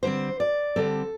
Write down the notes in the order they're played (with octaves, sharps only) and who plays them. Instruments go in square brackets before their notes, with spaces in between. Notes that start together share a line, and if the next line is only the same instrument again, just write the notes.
[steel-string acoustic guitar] D3 G3 C4 C5
D5
D3 G3 C4 A4